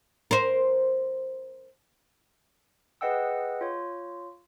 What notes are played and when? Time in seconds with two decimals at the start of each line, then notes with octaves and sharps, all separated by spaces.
0.31 A#4 C5
3.01 G#4 B4 D#5 F#5 G5 E6
3.61 F4 C#5